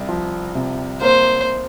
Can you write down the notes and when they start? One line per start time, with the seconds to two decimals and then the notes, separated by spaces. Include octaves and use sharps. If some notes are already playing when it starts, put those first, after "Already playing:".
Already playing: C2
0.09 F3
0.55 C3
1.02 A#3 C5